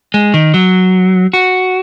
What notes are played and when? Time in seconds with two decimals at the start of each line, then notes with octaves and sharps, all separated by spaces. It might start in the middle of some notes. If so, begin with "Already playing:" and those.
0.14 G#3
0.34 D#3
0.54 F#3
1.33 F#4